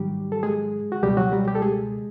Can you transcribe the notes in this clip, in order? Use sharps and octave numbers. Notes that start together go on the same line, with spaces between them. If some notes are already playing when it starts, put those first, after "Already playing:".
Already playing: G#2 D#3 F#3 G3 G4
A4
G#3 G#4
F#4
C#2 B2 F#3 G3 G4
F#3 F#4
G3 G4
G3 G4
A4
G#3 G#4